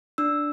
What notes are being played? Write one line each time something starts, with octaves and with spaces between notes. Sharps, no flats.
D4 E6